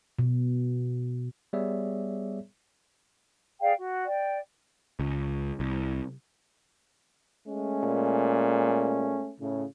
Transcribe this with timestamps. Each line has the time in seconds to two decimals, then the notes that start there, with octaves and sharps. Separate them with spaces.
0.19 B2
1.53 G3 B3 G#4 C#5 D5 E5
3.60 G#4 D5 F5 G5
3.78 F#4
4.06 D5 G5
5.00 C#2
5.60 C2
7.47 G#3 A3 C#4
7.83 A#2
9.40 A2 C#3